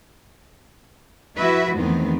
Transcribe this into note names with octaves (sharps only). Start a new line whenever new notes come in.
F3 E4 F#4 B4 E5
E2 D#3 F3 A3 B3 C4